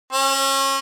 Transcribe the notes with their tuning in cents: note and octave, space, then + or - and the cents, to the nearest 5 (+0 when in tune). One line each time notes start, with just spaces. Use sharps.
C#4 -30